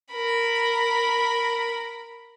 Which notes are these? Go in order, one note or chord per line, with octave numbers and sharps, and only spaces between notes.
A#4 B5